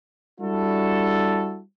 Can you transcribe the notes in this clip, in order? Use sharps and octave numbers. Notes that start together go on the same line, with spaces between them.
G3 D4 E4 F#4 A4